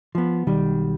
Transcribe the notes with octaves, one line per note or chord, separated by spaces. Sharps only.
F3 B3
B1 D#3 G3